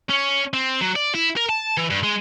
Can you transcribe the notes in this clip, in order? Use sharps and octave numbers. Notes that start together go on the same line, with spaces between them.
C#4
C4
F#3
D5
E4
A#4
A5
E3
G2
G#3